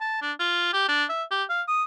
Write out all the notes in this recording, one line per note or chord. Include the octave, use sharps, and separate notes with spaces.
A5
D4
F4
G4
D4
E5
G4
F5
D#6